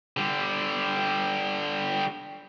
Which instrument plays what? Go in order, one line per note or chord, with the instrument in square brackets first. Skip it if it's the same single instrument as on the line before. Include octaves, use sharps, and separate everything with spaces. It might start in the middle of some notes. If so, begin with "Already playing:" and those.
[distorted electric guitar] D3 G3